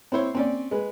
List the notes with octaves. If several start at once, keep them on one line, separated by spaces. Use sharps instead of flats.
C4 E4 C5 C#5
C4 C#4 D5
G#3 B4